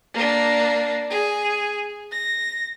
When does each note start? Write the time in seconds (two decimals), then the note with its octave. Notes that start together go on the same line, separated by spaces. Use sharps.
0.14 A#3 D4
1.10 G#4
2.12 A#6